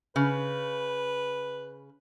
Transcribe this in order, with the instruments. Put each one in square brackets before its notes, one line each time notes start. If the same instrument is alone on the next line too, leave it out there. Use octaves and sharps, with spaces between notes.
[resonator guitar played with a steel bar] C#3 [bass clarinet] B4